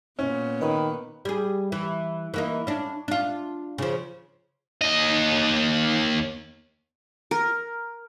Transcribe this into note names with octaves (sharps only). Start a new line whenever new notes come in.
A#2 B3 C#4
D#3 A#3 B4 D#5
G3 G#4
E3
E3 A#3 D#4
C#4 D4
D4 F4
C#3 F3
D#2 D#5
A#4